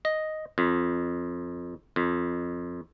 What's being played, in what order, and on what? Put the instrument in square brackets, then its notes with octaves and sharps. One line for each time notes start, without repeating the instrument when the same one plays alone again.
[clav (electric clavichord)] D#5
F2
F2